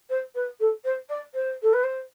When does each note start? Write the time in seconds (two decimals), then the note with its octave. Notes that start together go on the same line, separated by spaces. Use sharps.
0.09 C5
0.34 B4
0.59 A4
0.84 C5
1.09 D5
1.34 C5
1.62 A4
1.73 B4
1.83 C5